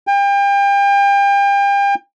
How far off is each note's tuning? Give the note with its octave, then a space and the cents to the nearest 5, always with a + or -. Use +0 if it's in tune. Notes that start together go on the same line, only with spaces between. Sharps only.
G5 +35